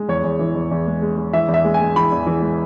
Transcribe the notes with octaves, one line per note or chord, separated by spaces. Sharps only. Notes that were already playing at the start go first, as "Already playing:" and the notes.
Already playing: G#3
E2 C#5
E2
E3
E2
E2
G#3
G#3
G#3
E3 E5
E2
E5
G#3
G#5
G#3
E3 B5
E2
E3
G#3